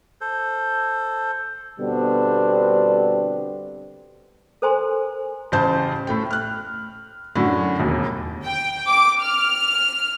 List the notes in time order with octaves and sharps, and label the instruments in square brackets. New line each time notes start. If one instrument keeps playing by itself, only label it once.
[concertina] A4 C5
[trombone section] B2 D3 G3 B3 C4 D4
[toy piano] A4 A#4 C5 G#5 A#5 C6
[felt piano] A1 C#3 C5 A5 G6
A2 A3 G5
F6 F#6
F#2 A2 D3 F#3
E1 D#2
[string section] G5
D6
F6